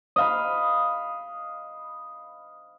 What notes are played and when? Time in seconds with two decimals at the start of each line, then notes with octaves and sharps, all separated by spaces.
0.16 D#5 F5 B5